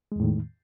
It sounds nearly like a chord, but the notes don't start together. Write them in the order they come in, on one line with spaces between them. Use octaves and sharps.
G#3 E2 A2 D#3